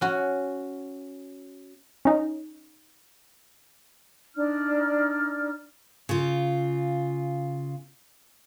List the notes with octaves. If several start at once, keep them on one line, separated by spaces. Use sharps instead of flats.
C#4 F#4
C#4 D#4
D4 D#4 D5 F6
C#3 F4